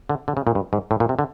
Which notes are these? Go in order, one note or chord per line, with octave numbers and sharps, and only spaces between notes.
D3
D3
C#3
A#2
G2
G#2
A2
A#2
C3
D3